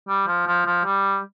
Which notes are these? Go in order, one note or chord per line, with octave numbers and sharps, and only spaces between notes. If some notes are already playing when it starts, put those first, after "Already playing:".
G3
F3
F3
F3
G3